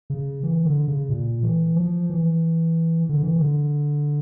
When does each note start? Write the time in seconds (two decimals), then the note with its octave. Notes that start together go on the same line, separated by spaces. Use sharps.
0.10 C#3
0.43 E3
0.65 D3
0.88 C#3
1.09 A#2
1.43 E3
1.76 F3
2.10 E3
3.09 D3
3.23 E3
3.36 D3